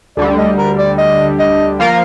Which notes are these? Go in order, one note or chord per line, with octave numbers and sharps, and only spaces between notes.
D2 D3 G3 D5
D#5
A#4
D5
D#5
D#5
F3 A#3 F4 A#4 F5